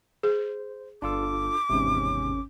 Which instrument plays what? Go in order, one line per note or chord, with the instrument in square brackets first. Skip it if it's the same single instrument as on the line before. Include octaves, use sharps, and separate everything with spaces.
[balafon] G#4 [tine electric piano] C5
[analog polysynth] G1 [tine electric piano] D4 F4 A4 [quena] D6
[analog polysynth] G#1 C#4 [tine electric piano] E2 G#2 C3